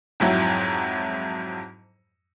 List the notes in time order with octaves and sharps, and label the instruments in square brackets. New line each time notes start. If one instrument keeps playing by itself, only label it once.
[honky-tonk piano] F2 G#2 F#3 E4